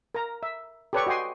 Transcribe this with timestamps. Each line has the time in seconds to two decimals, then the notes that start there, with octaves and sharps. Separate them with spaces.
0.14 A#4 A#5
0.43 E5
0.93 G4 A4 B4 C#5 D5 C#6
1.07 F#4 D#5 G5 G#5 C6